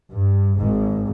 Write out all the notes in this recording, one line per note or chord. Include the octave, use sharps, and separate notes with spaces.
G2
G#1 G#2